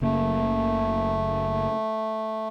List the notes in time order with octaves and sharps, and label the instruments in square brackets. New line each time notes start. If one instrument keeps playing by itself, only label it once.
[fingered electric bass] F#1 C#3 A#3 [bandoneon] A3